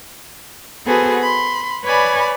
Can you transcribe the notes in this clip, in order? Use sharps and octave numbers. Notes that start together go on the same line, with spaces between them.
B3 F#4 G#4 A4 B4 C5
B5 C6
B4 C#5 D5 G#5 B5